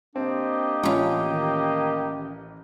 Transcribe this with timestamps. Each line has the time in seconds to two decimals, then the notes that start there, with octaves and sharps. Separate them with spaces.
0.16 A#3 C4 D4 G4 D#5
0.83 A1 C#4 F4
1.30 D#3